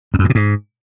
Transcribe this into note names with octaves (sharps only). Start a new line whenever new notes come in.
F2
F#2
G2
B2
G#2